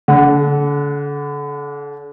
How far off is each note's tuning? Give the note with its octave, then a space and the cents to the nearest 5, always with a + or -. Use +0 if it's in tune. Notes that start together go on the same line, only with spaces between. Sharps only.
D3 -35 F#5 +0